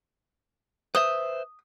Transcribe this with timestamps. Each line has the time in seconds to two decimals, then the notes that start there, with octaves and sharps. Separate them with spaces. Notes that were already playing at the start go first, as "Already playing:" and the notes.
0.95 B4 C5 E5 D#6